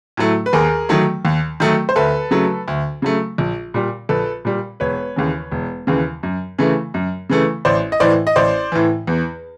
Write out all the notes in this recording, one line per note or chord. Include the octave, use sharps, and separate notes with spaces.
A2 F#3 A3
B4
D#2 G#4 A#4
D#3 F#3 A3
D#2
D#3 F#3 A3
C5
D2 A4 B4
C#3 F#3 A3
D2
C#3 F#3 A3
A#1
A#2 G3
A#1 A4 B4
A#2 G3
E1 B4 C#5
D#2 C#3 E3
E1
D#2 C#3 E3
F#2
C#3 E3 A3
F#2
C#3 E3 A3
A1 C5 D5
D#5
A2 E3 C5 D5
D#5
A1 C5 D5
A2 E3
E2